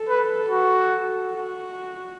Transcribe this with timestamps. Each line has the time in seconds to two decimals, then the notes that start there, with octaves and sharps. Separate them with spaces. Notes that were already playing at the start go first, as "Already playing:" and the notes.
Already playing: A4
0.09 B4
0.49 F#4
1.31 F#4